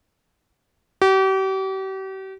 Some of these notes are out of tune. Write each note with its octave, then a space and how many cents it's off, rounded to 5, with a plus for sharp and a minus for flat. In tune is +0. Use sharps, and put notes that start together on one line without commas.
G4 -40